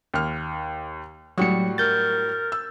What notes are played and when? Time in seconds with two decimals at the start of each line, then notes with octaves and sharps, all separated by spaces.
0.14 D#2 F6
1.38 A2 F#3 G3 F#4 C#7
1.78 A#4 G6 A6
2.52 E6